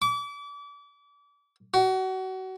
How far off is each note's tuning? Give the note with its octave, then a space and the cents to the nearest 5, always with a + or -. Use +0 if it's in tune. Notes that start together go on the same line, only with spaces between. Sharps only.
D6 -35
F#4 +30